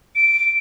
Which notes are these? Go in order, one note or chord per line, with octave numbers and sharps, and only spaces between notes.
D7